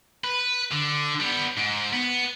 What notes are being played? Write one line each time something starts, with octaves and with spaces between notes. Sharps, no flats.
B4
D3
G3 B3
G#2
B3